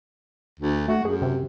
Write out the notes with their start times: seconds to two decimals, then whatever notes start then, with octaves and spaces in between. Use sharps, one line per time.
0.60 D2
0.88 A3 F#4
1.05 F#2 G#4
1.22 C3